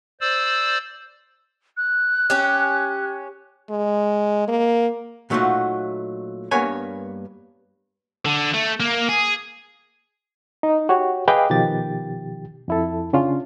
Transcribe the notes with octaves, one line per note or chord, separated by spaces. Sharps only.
C5 D5 E6
F#6
C#4 G4
G#3
A#3
A#2 F#3 A3 D#4 F4 F#4
G2 A#3 B3 A#4 C#5 G#5
D3
A3
A#3
G#4
D#4
F#4 G4 C#5
G#4 B4 D#5 F5 G5 D6
B2 D#3 F3 G4 A6
F2 E4 A4
C#3 C#4 D4 F4